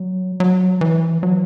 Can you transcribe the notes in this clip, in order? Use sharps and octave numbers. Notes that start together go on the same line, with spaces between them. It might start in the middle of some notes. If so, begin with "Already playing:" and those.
Already playing: F#3
F#3
E3
F#3